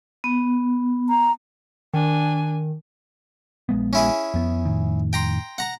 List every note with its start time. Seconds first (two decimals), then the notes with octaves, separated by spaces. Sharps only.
0.24 B3
1.09 A#5
1.94 D#3 D4 G#5
3.69 A#1 G#3 B3
3.93 C#4 E4 G#4
4.34 F2 B3
4.65 F2 A2 D#3
5.13 G5 A#5 C6
5.58 F#5 A#5